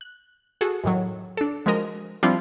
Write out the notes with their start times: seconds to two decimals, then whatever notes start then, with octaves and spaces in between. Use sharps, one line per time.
0.01 F#6
0.61 F#4 G#4 A4
0.84 F#2 A2 D#3 F#3
1.37 D4 A4
1.66 F3 G#3 F#4 A#4 D#5
2.23 F3 G3 C4 D4 E4 F4